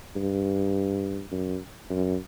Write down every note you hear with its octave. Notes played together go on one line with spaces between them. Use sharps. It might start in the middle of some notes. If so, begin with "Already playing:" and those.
G2
F#2
F#2